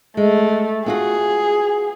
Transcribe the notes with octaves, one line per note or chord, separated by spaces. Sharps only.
G#3 A3
B3 F4 F#4 G#4